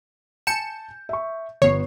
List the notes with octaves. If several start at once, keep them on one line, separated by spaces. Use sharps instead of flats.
G#5 A5 G6 C#7 E7
E5 C#6
G1 B3 C#5 C7